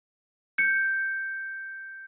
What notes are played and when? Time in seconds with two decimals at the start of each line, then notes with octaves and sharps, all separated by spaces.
0.58 G6 C#7